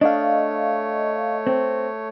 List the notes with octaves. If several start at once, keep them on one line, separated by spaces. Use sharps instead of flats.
A3 D4 C#5 D#5 F5
C4